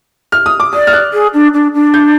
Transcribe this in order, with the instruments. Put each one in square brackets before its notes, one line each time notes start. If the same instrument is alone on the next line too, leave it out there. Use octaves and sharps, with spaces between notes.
[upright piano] F6
D#6
D6
[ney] D5 [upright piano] D#6
[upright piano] F6
F#6
[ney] G#4
D4
D4
D4
[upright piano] G6